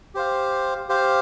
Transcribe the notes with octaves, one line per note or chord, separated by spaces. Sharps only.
G4 C5 F5
G4 C5 F5